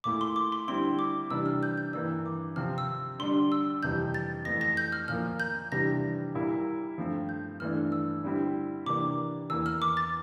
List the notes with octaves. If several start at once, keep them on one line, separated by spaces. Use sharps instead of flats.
A#2 A3 E4 D6
C6
D6
C6
D3 G3 C4 E4 C6
D6
C3 E3 G3 D4 E6
F6
G6
G6
G2 E3 A#3 D4 E6
D6
C3 F3 C4 F6
E6
D3 G3 D4 C6
E6
F2 C3 E3 G3 G6
A6
F2 E3 A3 A#6
A#6
G6
F6
A#2 F3 A#3 F6
G6
C3 E3 G3 D4 A#6
A#2 G3 A#3 E4
G2 F3 A3 C4
G6
G2 E3 A3 D4 F6
E6
D3 G3 C4 E4
C3 E3 A#3 D4 D6
E2 E3 A#3 E6
F6
D6
A6